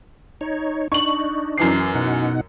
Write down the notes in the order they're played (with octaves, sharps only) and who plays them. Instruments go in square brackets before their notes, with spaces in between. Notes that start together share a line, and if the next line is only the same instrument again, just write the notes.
[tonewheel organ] D#4 C#5
[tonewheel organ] D4 D#4 [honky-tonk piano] C#6 F#7
[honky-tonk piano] F#2 E3 C7
[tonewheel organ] B2 D#4 F#5